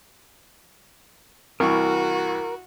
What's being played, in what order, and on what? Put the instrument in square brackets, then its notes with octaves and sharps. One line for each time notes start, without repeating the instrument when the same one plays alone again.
[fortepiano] C2 E3 C#6 [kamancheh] F#4 [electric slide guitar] A#4